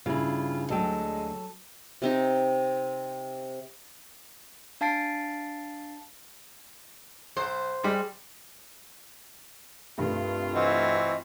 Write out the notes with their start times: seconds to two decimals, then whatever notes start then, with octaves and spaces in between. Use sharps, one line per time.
0.06 G2 C#3 E4 F4 G#4
0.70 D2 F#3 G#3 A4 G5
2.02 C3 C4 D#4
4.81 D4 F5 A5 A6 C7 D7
7.37 B1 C5
7.83 G3 G#3
9.98 C2 G2 A3 F4
10.55 E3 C4 F#4 D#5